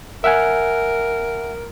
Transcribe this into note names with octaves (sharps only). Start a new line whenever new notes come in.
A#4 E5 F#5 G#5